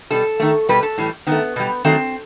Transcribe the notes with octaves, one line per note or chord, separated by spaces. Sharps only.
B2 G3 A4
D#3 A3
B2 G3 B4
A4
A2 E3 G3
D#3 A3 B3
B2 G3
D#3 F#3 A3 C4